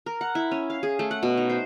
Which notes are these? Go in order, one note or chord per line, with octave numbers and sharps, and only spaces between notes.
A#4
F#5
E4
C#4
F5
G#4
A3
F#5
B2
D#4
C5